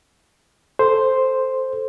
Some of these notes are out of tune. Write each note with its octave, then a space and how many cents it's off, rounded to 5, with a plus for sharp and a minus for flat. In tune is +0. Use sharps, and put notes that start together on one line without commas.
A4 +0 C5 +0